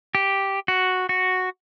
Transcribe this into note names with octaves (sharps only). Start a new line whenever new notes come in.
G4
F#4
F#4